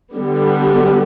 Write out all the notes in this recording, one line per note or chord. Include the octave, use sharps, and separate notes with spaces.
D3 G3 B3